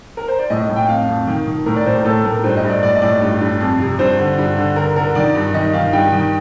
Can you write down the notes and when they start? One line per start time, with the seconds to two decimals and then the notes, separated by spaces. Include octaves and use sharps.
0.17 A#4
0.28 C5
0.39 D5
0.50 A2 D#5
0.69 A2
0.76 G5
0.89 F2 F5
1.09 F2
1.27 D#3
1.47 D#3
1.66 A2 A#4
1.76 D5
1.86 A2 C5
1.95 A#4
2.05 A2 A4
2.24 A2 A#4
2.44 G2 C5
2.57 D#5
2.63 G2
2.70 D5
2.83 A2 D5
2.96 D#5
3.02 A2 D5
3.21 G2
3.41 G2
3.60 F2
3.79 C3
3.99 G2 C5
4.18 D3
4.38 G2
4.57 D3
4.76 D3 A#4
4.96 D3 A#4
5.15 D#3 D5
5.35 G2
5.54 D#3 D#5
5.73 D#3 F5
5.93 G2 G5
6.12 D#3